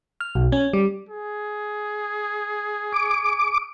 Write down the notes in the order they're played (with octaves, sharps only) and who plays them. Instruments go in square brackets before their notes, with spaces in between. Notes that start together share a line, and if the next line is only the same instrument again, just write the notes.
[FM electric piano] F6
B1
C#4
G3
[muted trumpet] G#4
[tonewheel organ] D6